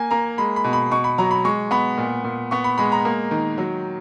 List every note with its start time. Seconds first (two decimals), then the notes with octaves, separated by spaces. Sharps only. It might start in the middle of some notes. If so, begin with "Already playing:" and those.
Already playing: A#3 G#5
0.11 A#3 A#5
0.38 G#3 B5
0.56 B5
0.64 B2
0.73 B5
0.92 B2 C#6
1.04 B5
1.18 F#3 A#5
1.31 B5
1.44 G#3 C#6
1.71 B3 B5
1.98 A#2
2.24 A#2
2.51 B3 C#6
2.64 B5
2.78 G#3 B5
2.92 A#5
3.05 A#3
3.31 D#3
3.58 F#3